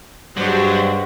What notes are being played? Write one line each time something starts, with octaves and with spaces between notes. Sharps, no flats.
G2 F#3 G#3 D4 F#4 G4 C5